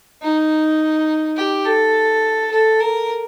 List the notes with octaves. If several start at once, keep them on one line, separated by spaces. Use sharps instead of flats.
D#4
G4
A4
A4
A#4